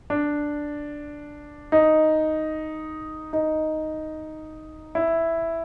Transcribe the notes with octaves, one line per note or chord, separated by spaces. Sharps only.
D4
D#4
D#4
E4